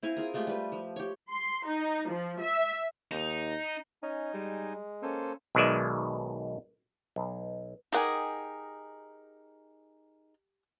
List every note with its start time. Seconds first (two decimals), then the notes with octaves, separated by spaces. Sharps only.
0.03 C4 E4 F5 G#5
0.17 F4 G#4 A#4
0.34 G#3 A3 F4 G4
0.47 G3 B4
0.72 F3
0.96 G4 C#5
1.30 C6
1.66 D#4
2.09 F3
2.40 E5
3.11 D#2 D#4
4.03 C#4 D#4 D#5 G#5
4.34 G3 G#3
5.03 A#3 C#4 A4 C5
5.55 B1 B2 D#3 G#3 D5 E5
7.16 B1
7.92 D#4 G4 G#4 A#4 F#5 G#5